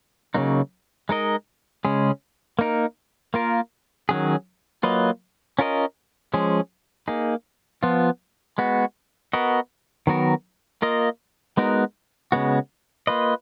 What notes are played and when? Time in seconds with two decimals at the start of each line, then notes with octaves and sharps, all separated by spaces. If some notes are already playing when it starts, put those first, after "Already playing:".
0.34 C#3 F#3 A#3 D#4
1.09 G#3 D#4 A#4 D#5
1.85 C#3 G#3 C#4 G#4
2.59 A#3 D#4 A#4
3.34 A#3 F4 A#4
4.09 D#3 F#3 C#4 G#4
4.83 F#3 A#3 F4 B4 D#5
5.59 C#4 F4 A#4 D#5
6.34 F3 G#3 C#4 G#4
7.08 A#3 D#4 G#4
7.83 F3 B3 F4
8.58 G#3 B3 F#4
9.33 B3 F#4 A#4 D#5
10.07 D#3 F#3 B3 F#4 A#4
10.82 A#3 F4 A#4 D#5
11.57 G#3 B3 D#4 F#4 A#4
12.32 C#3 G#3 B3 F#4
13.07 A#3 F4 B4 D#5